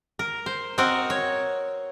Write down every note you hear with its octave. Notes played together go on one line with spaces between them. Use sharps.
A#4
C5
C4 F#4 A#4 D#5
C#5